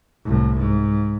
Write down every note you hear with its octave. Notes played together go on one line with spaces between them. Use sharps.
C2 A2
G#2